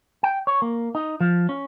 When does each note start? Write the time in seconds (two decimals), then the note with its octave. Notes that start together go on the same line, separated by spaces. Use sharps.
0.23 G5
0.47 C#5
0.62 A#3
0.95 D#4
1.20 F3
1.49 C#4